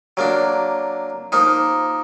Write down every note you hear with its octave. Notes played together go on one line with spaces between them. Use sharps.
F#3 A#3 D4
F3 A#3 D#4